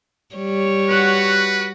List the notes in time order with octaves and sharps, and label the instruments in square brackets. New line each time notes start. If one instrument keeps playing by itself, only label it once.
[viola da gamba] G3 C#5
[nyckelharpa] F#4 F#5 [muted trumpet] B4